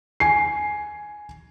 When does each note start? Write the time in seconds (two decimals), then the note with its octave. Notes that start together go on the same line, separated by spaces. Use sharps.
0.20 G#5 C7